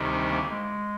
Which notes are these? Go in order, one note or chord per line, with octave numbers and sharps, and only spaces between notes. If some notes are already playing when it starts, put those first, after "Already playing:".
Already playing: D2 C3 D#3 G3
D4
A#3
G#3